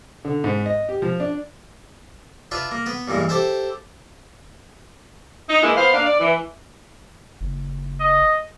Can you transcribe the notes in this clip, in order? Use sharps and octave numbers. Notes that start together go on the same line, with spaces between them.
D3
G#2
D#5
G4
F3
D4
D4 F4 B4 E5
A#3
B3 B4
G2 A#2 E3 G#3
G4 A4 C5 E5
D#4
E3 G#3 A#3 E4
B3 C5 F5
A#3 D4 F5
D5
E3
F#1
D#5